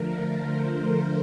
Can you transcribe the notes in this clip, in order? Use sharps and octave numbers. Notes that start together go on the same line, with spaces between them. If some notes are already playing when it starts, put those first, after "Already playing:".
Already playing: D3 F3 A3 A#4
C5